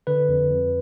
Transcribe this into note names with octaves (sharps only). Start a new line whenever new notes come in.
D3 B4
F2
F2